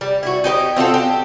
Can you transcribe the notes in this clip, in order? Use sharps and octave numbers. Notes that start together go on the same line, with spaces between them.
G3
E4 F#4
D#4 G4 B4 D#5
C4 F4 F#4 A4
G4